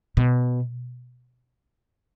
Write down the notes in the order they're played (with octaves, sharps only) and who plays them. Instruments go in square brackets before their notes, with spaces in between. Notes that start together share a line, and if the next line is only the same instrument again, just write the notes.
[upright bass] B2